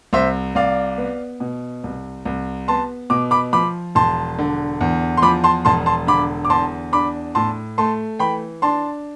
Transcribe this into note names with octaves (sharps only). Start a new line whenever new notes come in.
C2 C5 E5
C2 D5 F5
B3
B2
C2
C2
B3 A5 C6
B2 D6
B5 D6
F3 B5 D6
E1 A5 C6
D3
E2
C6
F3 B5 D6
A5 C6
E1 A5 C6
A5 C6
D3 B5 D6
D6
E2 A5 C6
D4 B5 D6
A2 A5 C6
A3 A5 C6
E3 G5 B5
D4 A5 C6